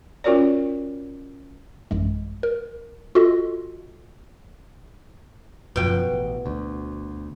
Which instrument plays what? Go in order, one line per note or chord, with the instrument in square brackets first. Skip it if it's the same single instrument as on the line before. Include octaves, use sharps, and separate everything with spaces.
[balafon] C#4 F4 F#4 A#4 C#5 D5
[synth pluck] A1 F#2 G#3
A#4
F4 F#4 A4 D#5
[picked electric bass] F#1 F#2 F3 [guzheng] B2 G5
[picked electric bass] A1
D2